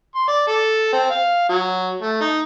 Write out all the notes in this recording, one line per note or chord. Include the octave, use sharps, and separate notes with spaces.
C6
D5
A4
C4
F5
F#3
A3
D#4